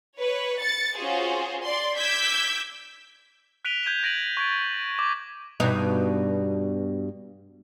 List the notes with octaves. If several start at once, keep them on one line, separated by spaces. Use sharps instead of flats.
B4 C#5
A6 C#7
C#4 F4 F#4 G#4 C5
D5 C6
D6 E6 G6 G#6 B6
F#6 B6 D7 D#7 F7 G7
G6 G#6 D#7 E7 G7
G#6 A#6 D7 D#7 F#7
C#6 G#6 A6 D7
D6
G2 B2 D#4